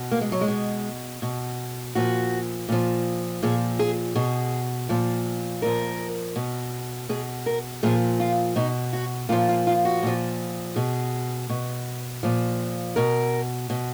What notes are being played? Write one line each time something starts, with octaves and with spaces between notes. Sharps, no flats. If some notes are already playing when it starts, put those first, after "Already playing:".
Already playing: B2
A#3
G#3
F#3
G#3
B2
B2
A#2 F3 F#4
A#2 F3
A#2 F3 G#4
G#4
B2 G#4
A#2 F3
A#2 F3 A#4
B2
B2 G#4
A#4
A#2 F3 G#4
F4
B2 D#4
F#4
A#2 F3 F4
F4
F4
F#4
A#2 F3
B2 G#4
B2
A#2 F3
B2 A#4
B2